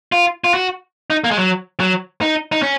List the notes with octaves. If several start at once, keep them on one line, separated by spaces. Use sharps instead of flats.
F4
F4
F#4
D#4
A#3
G#3
F#3
F#3
D#4
D#4
C#4